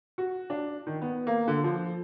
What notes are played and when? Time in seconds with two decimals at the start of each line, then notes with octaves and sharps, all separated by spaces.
0.18 F#4
0.50 D4
0.87 D#3
1.02 B3
1.27 A#3
1.48 D3
1.64 F3